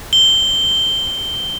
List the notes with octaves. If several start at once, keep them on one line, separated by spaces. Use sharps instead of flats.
G7